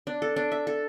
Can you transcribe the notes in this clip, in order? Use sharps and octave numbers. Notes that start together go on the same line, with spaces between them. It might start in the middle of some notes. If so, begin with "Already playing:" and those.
D4
A4
D4
E5
A4